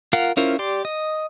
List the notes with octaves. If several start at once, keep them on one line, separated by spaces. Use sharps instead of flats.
F4 A#4 F5 F#5
C#4 E4 F4 A#4 C5
G4 D5 C6
D#5